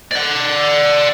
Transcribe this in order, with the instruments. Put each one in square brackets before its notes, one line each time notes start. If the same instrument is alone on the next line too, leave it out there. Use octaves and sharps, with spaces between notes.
[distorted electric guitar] D5 F#5